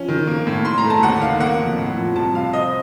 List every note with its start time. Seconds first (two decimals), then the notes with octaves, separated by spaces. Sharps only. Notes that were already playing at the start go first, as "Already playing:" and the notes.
Already playing: F3 C#4
0.08 D#3
0.27 A#3
0.47 A2
0.65 A2 C6
0.78 A#5
0.84 A3
0.90 A5
1.03 D#2 F#5
1.21 D#3 F5
1.40 A#3 F#5
1.59 F2
1.78 A2
1.98 F3
2.16 C2 A5
2.34 C3 F5
2.53 C4 D#5